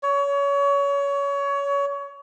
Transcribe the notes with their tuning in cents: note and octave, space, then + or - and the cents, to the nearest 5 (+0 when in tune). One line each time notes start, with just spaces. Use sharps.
C#5 +25